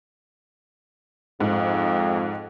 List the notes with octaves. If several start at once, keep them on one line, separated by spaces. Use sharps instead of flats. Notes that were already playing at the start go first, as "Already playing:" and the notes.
F2 G#2